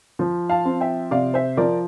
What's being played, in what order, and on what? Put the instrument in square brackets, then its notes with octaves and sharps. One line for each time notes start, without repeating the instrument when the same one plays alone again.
[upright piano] F3
[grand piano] F5 A5
[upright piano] C4
[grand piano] E5 G5
[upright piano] C3 [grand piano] D5 F5
[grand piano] C5 E5
[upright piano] F3 [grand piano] A#4 D5